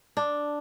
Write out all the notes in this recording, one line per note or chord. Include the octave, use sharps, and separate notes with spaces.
D4